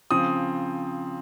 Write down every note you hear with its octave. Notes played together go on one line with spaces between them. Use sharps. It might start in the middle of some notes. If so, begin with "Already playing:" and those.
C#3 F3 C4 D#6